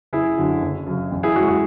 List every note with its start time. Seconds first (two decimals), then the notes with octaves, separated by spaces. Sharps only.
0.13 F#1 E4 G#4
0.37 F#2 D3 F#3
0.62 F#1
0.87 F#2 C#3
1.11 A1
1.23 E4 G#4
1.35 A2 F#4
1.39 G#3
1.48 F#4